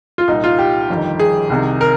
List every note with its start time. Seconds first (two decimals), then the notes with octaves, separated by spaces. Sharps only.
0.18 F4
0.28 C2 A#2 D#4
0.44 F4
0.59 G4
0.90 G1 F2 D#3
1.19 G#4
1.50 C2 C3 D#3
1.81 A#4